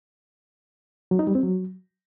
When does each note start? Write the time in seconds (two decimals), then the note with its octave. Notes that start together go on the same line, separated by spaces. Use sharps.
1.11 F#3
1.19 D#4
1.27 G3
1.35 C4
1.43 F#3